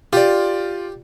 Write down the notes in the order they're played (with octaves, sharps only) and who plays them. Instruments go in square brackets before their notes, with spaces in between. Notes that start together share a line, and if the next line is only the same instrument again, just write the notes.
[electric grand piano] F4 D5 [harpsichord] G4